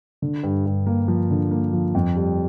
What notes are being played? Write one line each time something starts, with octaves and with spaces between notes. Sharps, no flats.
D3
G2
G2
A#3
F3
D3
A#3
F3
F2
G3